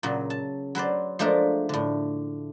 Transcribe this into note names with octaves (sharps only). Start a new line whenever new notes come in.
A#2 C#3 F#3
A5
F#3 B4 C5 D5
F3 G#3 A3 D4 A4 A#4
A2 D3